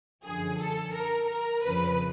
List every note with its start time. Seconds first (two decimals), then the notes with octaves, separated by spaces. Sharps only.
0.24 F#2 D3 F3 G#4
0.59 A4
0.93 A#4
1.29 A#4
1.63 F2 C#3 F3 B4